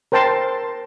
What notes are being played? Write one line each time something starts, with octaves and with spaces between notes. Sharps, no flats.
A#4 C5 G5 A5 C6